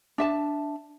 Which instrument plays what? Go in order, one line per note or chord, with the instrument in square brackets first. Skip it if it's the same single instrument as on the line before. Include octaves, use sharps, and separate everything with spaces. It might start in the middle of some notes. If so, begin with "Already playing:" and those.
[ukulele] D4 E5 A5